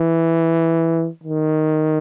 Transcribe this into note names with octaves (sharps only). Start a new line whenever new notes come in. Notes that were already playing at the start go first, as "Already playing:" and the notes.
Already playing: E3
D#3